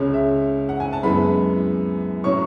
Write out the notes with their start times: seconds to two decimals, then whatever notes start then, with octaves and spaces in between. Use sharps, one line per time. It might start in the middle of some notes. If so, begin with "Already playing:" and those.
Already playing: C#2 C#3 G#3 C#4
0.14 E5
0.69 F#5
0.80 G#5
0.93 A5
1.03 F#2 E3 G#3 B3 B5
2.24 A2 F#3 C#4 C#6